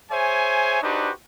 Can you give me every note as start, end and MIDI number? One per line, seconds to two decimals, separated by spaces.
0.12 0.81 68
0.12 0.81 72
0.12 0.81 73
0.12 0.81 76
0.12 0.81 80
0.82 1.11 62
0.82 1.11 63
0.82 1.11 66
0.82 1.11 67
0.82 1.11 71
0.82 1.11 72